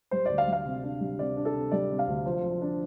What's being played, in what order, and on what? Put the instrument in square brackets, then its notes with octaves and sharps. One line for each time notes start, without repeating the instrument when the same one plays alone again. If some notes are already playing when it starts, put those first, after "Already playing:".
[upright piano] G3 [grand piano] C5
[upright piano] D2 [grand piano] D5
[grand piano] F5
[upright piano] G3
[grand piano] F5
[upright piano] C3
D4
G3
[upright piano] C3 [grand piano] D5
[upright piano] D4
[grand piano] A4
[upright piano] C3
[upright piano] G3 [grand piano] D5
[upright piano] C3
[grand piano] F5
[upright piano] D2
[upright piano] F3 [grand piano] C5
[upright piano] F3
D4